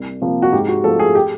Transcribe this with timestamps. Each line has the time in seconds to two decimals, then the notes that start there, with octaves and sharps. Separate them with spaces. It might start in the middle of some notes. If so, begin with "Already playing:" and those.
Already playing: C2
0.21 C3 F3 A#3
0.42 F#4
0.52 G#2 G4
0.68 F#4
0.84 F3 A3 C4 A4
1.00 G#4
1.15 G4